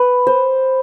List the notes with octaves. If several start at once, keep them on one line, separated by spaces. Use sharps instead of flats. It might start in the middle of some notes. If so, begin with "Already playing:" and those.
Already playing: B4
C5